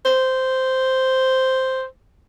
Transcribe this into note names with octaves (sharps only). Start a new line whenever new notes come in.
C5